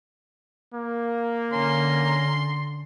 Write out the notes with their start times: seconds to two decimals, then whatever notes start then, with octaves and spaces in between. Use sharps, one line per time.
0.74 A#3
1.52 D3 C#4 A#5 C6